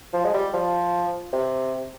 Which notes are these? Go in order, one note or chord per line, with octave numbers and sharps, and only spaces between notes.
F3
G#3
G3
F3
C3